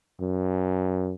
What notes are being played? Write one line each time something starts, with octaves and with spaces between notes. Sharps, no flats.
F#2